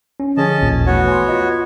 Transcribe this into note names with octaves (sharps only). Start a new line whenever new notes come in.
C#4
D3 F3 C#4 G#4 D#5 A5
A1 D#2 A#2
E3 A3 B3 F#4 C#5
G#5 C6
F4 D#5